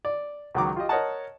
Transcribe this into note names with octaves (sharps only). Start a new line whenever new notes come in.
D5
C#2 D#3 F#3 A#5 D6
F4 G4 D#5
A#4 C#5 D#5 F#5 A5